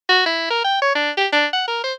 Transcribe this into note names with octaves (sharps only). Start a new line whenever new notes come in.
F#4
E4
A#4
G5
C#5
D4
G4
D4
F#5
A#4
C5